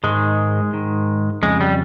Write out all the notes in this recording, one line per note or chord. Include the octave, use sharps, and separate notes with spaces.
G#2 D#3 G#3
G#2 D#3
F2 C#3 G#3
G3